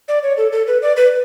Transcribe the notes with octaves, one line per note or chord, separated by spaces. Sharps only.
D5
C#5
A4
A4
B4
D5
B4